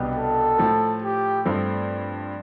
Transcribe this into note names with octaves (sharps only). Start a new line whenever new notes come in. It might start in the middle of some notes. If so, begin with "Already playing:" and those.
Already playing: C2 B2 B3 D4 G4
A4
A2 F3 A3
G4
G2 F3 A3 C4